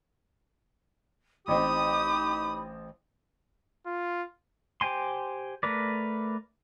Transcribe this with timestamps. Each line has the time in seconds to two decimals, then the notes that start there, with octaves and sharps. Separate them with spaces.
1.48 A1 C4 D#4 G4 B5 D#6
3.86 F4
4.81 G4 C5 G5 G#5 C6
5.63 A3 A#4 B4 D5